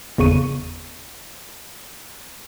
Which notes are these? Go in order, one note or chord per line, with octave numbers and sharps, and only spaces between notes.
G1 E2 C#3 C#6 D#7